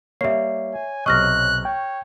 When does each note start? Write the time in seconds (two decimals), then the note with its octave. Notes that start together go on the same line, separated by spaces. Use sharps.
0.21 G3 A#3 C#5 E5 C7
0.74 G#5
1.06 B1 C3 D#5 C#6 F6 F#6 A#6
1.65 C#5 G5